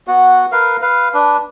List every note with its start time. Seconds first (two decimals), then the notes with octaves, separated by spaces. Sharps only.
0.08 B3 F#4 F#5
0.52 A#4 B4 F5
0.82 B4 F5
1.14 D4 B4